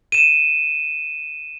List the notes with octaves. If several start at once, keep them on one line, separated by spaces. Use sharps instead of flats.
D#7 E7